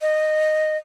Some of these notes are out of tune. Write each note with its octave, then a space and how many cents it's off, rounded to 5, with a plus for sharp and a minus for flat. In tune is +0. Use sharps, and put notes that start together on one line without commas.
D#5 -10